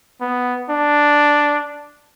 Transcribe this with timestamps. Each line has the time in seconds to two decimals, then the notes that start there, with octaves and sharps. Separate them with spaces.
0.21 B3
0.70 D4